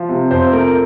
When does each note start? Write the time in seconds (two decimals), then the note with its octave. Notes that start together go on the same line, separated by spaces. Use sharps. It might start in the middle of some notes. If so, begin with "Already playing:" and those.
Already playing: F3
0.09 C3
0.31 F2 C5
0.53 A3 A#4